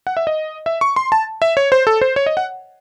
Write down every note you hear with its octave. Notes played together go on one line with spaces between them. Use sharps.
F#5
E5
D#5
E5
C#6
C6
A5
E5
C#5
C5
A4
C5
C#5
D#5
F#5